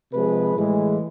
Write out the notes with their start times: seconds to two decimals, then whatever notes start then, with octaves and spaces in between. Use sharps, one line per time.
0.12 C3 F3 G#3 B4
0.56 A2 E3 G#3